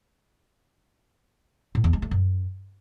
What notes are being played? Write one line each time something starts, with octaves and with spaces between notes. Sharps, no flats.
A2
E2
G#3
A3
F#2